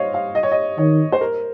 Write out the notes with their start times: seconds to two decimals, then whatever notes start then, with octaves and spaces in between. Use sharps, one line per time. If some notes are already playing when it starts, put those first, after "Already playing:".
Already playing: C5 C#5 D#5 F5
0.14 F5
0.35 D#5
0.43 C#5
0.52 D#5
0.78 D#3 C#5
1.12 C5
1.21 A#4